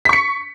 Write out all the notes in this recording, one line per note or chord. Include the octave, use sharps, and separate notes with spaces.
C#6 B6 C#7